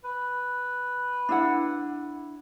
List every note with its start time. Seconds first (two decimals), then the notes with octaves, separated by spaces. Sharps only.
0.04 B4
1.29 D4 E4 F#5